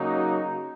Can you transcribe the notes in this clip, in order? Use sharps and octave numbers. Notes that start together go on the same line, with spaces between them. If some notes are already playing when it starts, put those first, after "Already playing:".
Already playing: C#3 F#3 A#3 D#4 F#4